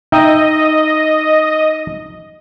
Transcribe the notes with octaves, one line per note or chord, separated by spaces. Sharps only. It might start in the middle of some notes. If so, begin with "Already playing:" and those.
D#4 D#5 E5 G5